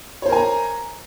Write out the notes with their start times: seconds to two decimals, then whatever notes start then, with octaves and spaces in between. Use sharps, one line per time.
0.22 C#5
0.26 C5
0.29 A#4
0.32 G#5
0.36 A#5